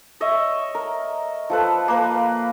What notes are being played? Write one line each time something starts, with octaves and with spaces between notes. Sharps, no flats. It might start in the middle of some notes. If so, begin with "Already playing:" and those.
C#5 D#5 E5
A#4
F3 A4 B4
A#3 A#4 B4